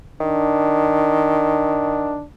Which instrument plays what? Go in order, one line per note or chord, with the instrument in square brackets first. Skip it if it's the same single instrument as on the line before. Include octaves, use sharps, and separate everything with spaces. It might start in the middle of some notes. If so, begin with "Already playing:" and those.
[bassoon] D#3 [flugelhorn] D4